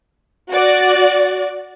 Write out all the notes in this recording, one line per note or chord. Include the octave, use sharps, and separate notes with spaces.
F#4 D5